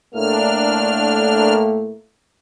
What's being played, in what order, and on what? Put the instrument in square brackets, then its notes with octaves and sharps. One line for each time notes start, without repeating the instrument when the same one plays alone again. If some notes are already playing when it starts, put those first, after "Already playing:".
[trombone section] A2 A3 A#3 [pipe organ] D4 F6